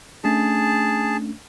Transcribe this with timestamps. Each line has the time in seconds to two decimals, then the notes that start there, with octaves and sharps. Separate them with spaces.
0.24 A3 C#4 D4 G#4 A5